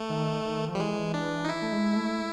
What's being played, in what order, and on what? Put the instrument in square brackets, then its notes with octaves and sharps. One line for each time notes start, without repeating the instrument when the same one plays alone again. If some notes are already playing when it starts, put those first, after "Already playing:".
Already playing: [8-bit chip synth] A3
[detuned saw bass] D#3
D#3
F3
[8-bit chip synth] G3
[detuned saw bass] E3 [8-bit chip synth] G#3
[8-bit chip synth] D4
D#4
E4
[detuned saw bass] A3
G#3
A3